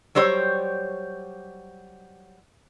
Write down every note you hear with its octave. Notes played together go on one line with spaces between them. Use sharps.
F#3 G3 C5 C#5